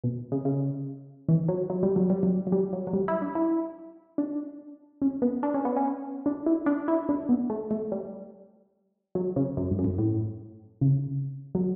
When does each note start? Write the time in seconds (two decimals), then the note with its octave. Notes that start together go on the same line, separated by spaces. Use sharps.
0.04 B2
0.32 C#3
0.45 C#3
1.29 E3
1.48 F#3
1.70 F#3
1.83 G3
1.96 F#3
2.10 G3
2.23 F#3
2.47 F#3
2.52 G3
2.73 F#3
2.87 F#3
2.93 G3
3.08 E4
3.22 D4
3.35 E4
4.18 D4
5.02 C#4
5.22 B3
5.43 D4
5.54 C#4
5.65 B3
5.76 C#4
6.26 D4
6.46 E4
6.66 D4
6.88 E4
7.09 D4
7.29 B3
7.50 A3
7.71 A3
7.92 G3
9.15 F#3
9.36 C#3
9.57 F#2
9.71 G2
9.79 F#2
9.84 G2
9.98 A2
10.81 C#3
11.55 F#3